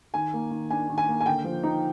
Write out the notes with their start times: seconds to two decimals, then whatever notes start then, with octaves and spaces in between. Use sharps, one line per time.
0.14 D#3 G#5
0.34 A#3
0.51 D#3
0.70 D4 G#5
0.90 D#3
0.98 G#5
1.08 A#3
1.21 G#5
1.26 D3 G5
1.44 F3
1.63 D#4